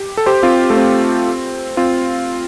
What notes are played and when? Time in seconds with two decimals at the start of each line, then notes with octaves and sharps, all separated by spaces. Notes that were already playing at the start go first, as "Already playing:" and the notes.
Already playing: G4
0.17 A4
0.26 G4 C5
0.43 C4 F4
0.70 A3
0.77 C4
1.77 C4 F4